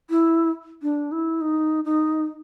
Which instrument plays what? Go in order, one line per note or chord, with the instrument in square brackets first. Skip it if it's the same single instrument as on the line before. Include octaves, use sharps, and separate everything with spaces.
[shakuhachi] E4
D4
E4
D#4
D#4